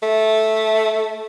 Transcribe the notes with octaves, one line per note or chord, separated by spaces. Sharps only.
A3